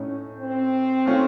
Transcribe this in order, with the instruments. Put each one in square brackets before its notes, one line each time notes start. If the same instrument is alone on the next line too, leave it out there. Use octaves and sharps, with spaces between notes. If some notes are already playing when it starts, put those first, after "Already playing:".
Already playing: [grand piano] A2 A3 D#4 [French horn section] C#4
[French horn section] C4
[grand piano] D#3 A3 C#4 F4